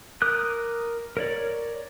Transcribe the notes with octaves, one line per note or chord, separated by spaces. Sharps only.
A#4 D6 D#6 F#6
A#4 C#5 D5